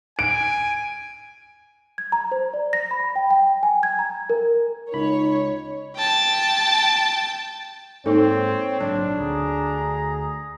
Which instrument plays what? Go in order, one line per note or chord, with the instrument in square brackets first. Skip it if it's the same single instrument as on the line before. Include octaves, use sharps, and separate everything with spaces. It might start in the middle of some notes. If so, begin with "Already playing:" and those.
[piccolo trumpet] G#5 [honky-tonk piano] D7
[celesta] G#6
A#5
C5
D5
A#6
B5
G5
G5
G#5
G#6
A#5
A#4
[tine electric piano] C#2 B5 [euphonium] D#4 [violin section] C#5
[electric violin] G5 A5
[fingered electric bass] G#2 [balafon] A#3 D#4 A4 [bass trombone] C4 [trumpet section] C#5
[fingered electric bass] A#1 G#2 F#3 [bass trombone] D4 [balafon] D5
[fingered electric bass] D2 [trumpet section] G#4 A#5